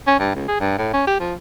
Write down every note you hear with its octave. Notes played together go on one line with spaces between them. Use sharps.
C#4
G2
C#2
G#4
G2
A2
C#4
G4
F3